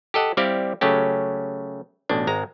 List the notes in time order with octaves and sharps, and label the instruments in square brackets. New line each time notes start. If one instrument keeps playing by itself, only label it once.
[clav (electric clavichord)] G4 A4 D#5 F#5
G3 C4 E4 G4 D5 F5
C#3 F#3 A3 C#4 G4
A1 B2 D4
G#1 G#3 A#5